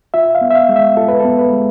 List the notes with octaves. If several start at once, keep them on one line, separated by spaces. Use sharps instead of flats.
F4 E5
F5
B3
E5
F5
G#3
E5
F4 A4
B4
B3 A4
B4
G#3